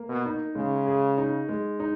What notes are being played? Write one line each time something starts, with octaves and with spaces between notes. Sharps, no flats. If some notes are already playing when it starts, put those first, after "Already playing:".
Already playing: A#3
B2
D#4
C#3 G#3
G#4
D#4
G#3
D#4